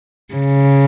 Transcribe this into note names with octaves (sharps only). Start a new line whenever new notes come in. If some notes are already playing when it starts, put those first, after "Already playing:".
C#3